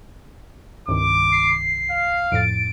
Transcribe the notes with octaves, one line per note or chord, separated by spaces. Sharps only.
C2 G2 D#3 D6
C7
F5
F2 A2 A6 D7